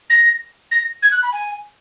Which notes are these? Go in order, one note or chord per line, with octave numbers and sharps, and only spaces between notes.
A#6
A#6
G#6
F#6
B5
G#5